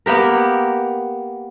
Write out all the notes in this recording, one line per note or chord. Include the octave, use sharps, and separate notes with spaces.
A#3 B3 G4 A#4